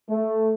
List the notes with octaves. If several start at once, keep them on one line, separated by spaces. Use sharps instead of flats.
A3